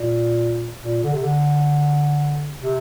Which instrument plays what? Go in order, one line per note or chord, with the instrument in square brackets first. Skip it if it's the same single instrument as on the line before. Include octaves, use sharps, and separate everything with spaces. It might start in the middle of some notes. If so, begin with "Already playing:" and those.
Already playing: [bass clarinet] A#2
A#2
D3
C3
D3
C3